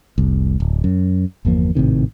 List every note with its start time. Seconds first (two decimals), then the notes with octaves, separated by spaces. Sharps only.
0.18 F1 C2
0.60 D1
0.84 F#2
1.45 G1 E2 F3 A#3
1.75 G#1 A2 C3 D#3